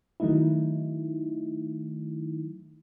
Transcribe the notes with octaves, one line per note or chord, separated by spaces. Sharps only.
D#3 F#3 A3 D#4 E4